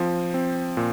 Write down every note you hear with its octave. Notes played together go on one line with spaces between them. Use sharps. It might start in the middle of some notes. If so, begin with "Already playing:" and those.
Already playing: F3 C4
C4
A#2